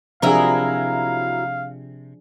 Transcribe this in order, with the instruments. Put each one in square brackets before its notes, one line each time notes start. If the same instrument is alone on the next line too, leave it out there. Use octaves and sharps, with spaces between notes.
[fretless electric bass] C3 [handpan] F3 D4 G#4 [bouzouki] F#3 E4 A#4 [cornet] F5